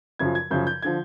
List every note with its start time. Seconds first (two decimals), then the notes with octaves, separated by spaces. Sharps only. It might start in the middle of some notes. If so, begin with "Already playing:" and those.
0.19 F#2 C#3 F3 G#6
0.35 G#6
0.51 F#2 C#3 F3 G6
0.67 G6
0.82 D3 F3 G#6